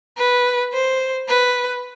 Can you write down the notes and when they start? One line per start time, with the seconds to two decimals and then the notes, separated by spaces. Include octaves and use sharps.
0.18 B4
0.73 C5
1.28 B4